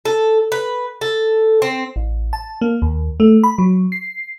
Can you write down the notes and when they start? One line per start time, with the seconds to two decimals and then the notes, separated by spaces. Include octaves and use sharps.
0.05 A4
0.52 B4
1.01 A4
1.62 C4
1.96 A1
2.33 A5
2.61 A#3
2.82 D#2
3.20 A3
3.44 B5
3.58 F#3
3.92 C7